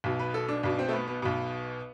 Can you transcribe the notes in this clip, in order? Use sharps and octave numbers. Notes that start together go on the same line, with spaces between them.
B1 B2
B4
A4
D4
B1 B2 D4
C4
A3
B3
B3
B1 B2 B3